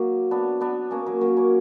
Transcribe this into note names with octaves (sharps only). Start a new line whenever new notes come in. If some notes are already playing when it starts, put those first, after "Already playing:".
Already playing: F#3 A#3
B3 D4
B3 D4
A#3 C#4
F#3 A#3
F#3 A#3
A#3 C#4